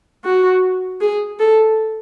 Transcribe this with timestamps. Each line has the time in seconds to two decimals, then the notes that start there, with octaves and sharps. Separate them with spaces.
0.25 F#4
1.01 G#4
1.40 A4